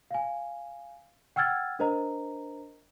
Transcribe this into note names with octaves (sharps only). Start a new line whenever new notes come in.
F5 G#5
F#5 G5 E6 F6 G#6 A6
D4 A#4 C5 D#5 A#5